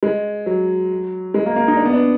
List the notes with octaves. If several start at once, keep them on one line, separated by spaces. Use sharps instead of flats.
G#3
F#3
G#3
A#3
A#3
D#4
D4
B3
D4